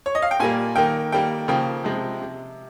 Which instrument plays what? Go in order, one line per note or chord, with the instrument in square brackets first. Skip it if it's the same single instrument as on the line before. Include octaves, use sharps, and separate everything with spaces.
[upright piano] C#5
D#5
F5
G5
A#2 G3 A#3 G#5
D#3 A#3 G5
D#3 G3 A#3 G5
C#3 F3 A#3 G5
C3 F3 G#3
C3